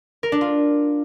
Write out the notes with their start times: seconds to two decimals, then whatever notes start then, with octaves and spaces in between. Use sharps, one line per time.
0.23 A#4
0.32 D4
0.41 F4